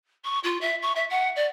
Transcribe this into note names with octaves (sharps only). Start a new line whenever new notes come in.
C#6
F4
E5
C#6
E5
F#5
D5